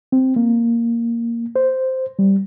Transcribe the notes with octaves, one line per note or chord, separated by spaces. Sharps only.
C4
A#3
C5
G3